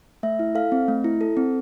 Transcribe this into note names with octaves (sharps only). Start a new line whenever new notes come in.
A3 E5
E4
A4 F5
C4
A3
E4
A4
C4